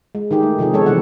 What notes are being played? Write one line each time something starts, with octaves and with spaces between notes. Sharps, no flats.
G#3
D#3 D#4 G4 G#4
A3
C3 F3 D#4 G#4
F3 G#3 B3 C4 A4 C#5
C3 E3 G3 B3 D#4 F#5